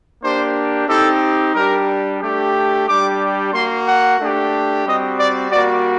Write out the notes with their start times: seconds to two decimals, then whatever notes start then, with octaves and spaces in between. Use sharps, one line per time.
0.22 A#3 D4 G4 C5
0.88 C4 D#4 G4 A4
1.54 G3 D4 G4 A#4
2.20 A3 D4 G4
2.87 G3 D4 G4 D6
3.53 A#3 F#4 C6
3.86 F#5
4.19 A3 D4 G4
4.85 G3 C4 F#4 D#5
5.18 D5
5.51 G3 A#3 F#4 D5